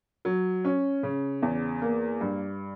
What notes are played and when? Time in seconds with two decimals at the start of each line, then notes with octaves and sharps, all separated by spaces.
0.25 F#3
0.64 C#4
1.03 C#3
1.42 E2
1.82 A#3
2.21 G2